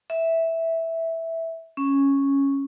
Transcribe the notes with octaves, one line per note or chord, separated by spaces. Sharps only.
E5
C#4